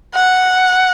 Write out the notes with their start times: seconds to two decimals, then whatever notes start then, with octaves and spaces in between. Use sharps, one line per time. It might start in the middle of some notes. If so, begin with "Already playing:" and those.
0.15 F#5